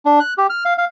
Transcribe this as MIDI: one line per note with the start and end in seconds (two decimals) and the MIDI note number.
0.05 0.19 62
0.20 0.34 90
0.38 0.47 67
0.50 0.64 89
0.65 0.74 77
0.78 0.85 77